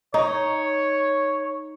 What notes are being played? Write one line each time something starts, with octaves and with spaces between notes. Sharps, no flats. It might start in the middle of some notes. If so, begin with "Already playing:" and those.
D#4 C#5